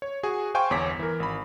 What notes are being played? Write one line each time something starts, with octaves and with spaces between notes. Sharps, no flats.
C#5
F#4 G#4 G#5
C5 F5 G5 G#5 C6 C#6
G1 E2 C#5 D6 B6
E3 A#4
G#1 B5